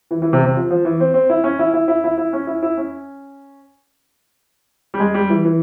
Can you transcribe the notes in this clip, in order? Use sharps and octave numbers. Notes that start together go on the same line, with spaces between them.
E3
E3
C3
C3
F3
F3
E3
C4
C4
E4
C#4
E4
E4
E4
E4
E4
C#4
E4
E4
C#4
G3
G#3
G3
E3
E3